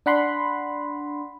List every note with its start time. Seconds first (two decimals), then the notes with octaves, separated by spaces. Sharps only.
0.06 D4 F#5 B5 C6